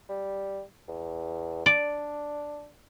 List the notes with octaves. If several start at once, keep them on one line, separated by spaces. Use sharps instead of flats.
G3
E2
D4 D5